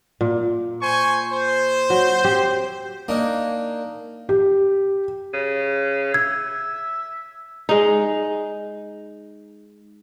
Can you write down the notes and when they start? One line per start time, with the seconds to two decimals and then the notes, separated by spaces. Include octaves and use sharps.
0.21 A#2
0.80 C5 G#5 C#6
1.31 C5
1.90 F#3
2.24 C4 G4
3.08 A#3 D4 D#4
4.29 G4
5.34 C#3
6.14 E5 G#6
7.69 G#3 D#4